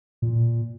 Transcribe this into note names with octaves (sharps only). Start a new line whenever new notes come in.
A#2